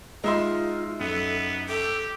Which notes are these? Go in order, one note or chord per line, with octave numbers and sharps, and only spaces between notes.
G#3 D#4 F4 E5 C6
F#2 B3 A4
G4 A4